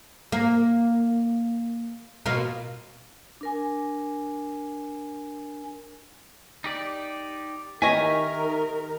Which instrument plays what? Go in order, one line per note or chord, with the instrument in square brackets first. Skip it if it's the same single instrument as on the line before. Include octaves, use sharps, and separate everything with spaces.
[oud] A#3
B2 A#3 F4
[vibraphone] D4 A#4 G#5
[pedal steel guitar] D#4 G4 D5
[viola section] D#3 A#4 [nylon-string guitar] G4 D#5 G#5 [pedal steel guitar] E5 C#6